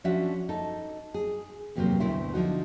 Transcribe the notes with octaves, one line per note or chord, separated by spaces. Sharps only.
F3 C#4 D4 F#4 E5
D#4 A4
G#4
E2 G2 C3 F#3 A#3 C5
D2 B2 A3 E4 C5 E5
D3 F3 D#4 F#4